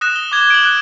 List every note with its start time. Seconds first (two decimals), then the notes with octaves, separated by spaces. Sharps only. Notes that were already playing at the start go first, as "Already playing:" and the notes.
0.01 D#6 F#6 A#6 E7
0.16 G7
0.32 D6 G#6 E7 G7
0.50 D7 F#7
0.63 F#6